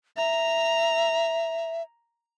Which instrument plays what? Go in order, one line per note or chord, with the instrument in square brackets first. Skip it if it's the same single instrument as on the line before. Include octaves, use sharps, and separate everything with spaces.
[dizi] E5 [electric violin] A#5